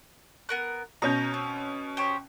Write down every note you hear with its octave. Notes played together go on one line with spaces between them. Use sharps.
B3 A#4 F#6
B2 C#4 A#5 G6
C4
G4 C5 C#5